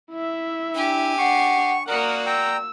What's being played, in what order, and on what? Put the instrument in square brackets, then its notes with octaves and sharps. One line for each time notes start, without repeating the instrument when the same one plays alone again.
[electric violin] E4 E5
[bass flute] D4 [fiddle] G4 G#5
[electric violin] D4 C7 [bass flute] F#5 [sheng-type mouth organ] C#6
[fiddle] A#3 F#4 [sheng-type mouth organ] A#4 [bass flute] D5 [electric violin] F#5 D#6
[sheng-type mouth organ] G5 A#5 [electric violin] E6